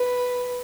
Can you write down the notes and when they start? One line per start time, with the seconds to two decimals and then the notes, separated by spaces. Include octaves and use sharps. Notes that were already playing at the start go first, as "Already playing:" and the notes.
Already playing: B4